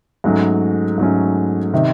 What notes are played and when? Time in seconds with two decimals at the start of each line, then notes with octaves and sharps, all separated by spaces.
0.24 G#2 F#3 A3 C#4
0.98 G#2 F#3 A3 C#4
1.73 C3 D#3